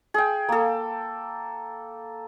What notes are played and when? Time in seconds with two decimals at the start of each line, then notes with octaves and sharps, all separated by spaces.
0.14 G#4 G5
0.49 A#3 A4